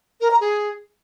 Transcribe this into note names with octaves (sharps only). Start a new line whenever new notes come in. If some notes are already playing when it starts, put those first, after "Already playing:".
A#4
A#5
G#4